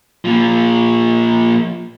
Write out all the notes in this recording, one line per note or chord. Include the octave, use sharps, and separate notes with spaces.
A#2 F3